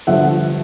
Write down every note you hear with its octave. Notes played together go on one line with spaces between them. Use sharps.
G1 G2 D3 F3 E5 F#5